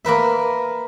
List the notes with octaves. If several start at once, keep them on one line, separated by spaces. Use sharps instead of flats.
A#3 A#4 B4 E5